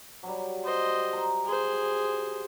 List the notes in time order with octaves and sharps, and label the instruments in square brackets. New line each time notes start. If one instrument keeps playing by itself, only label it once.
[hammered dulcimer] F#3 G3
[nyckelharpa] C5 D#5
[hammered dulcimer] A#5
[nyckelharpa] G#4 C5